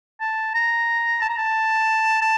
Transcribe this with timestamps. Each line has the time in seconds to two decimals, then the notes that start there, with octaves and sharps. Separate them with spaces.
0.21 A5
0.55 A#5
1.21 A5
1.29 A#5
1.38 A5
2.22 A5